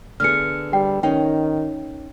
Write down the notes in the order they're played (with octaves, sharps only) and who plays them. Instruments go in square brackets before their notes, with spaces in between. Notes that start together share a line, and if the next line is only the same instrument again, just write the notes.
[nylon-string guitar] D3 B3 G#4 [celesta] F6 C#7
[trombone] G3 [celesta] G5
[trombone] D#3 [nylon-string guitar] C#4 D#4 [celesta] G5